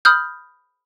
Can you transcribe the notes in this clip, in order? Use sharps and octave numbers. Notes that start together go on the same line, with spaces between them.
B5 D#6 F6 G6